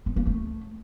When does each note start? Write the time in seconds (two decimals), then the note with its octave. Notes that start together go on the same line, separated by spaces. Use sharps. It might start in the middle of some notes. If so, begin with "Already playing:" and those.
0.06 B3
0.16 A#3
0.26 A3